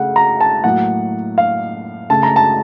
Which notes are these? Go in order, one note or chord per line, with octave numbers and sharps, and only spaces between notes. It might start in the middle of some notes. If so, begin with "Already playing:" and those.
Already playing: C#3 A3 F#5
A#5
A5
A2 F#3 A#3 F#5
F5
C#3 A3 A5
A#5
A5